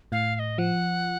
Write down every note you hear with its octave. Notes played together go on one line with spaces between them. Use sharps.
A2 F5
F5
D#5
F3 F#5